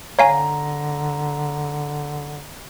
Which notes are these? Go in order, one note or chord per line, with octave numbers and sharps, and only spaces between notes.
D3 C#5 F5 G#5 A#5